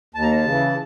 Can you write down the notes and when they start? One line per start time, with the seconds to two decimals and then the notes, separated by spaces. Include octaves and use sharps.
0.14 D#2 A5
0.22 A#5
0.31 A5
0.44 C#3
0.49 E3